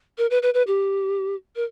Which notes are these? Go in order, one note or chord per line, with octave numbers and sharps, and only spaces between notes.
A#4
B4
B4
B4
G4
A#4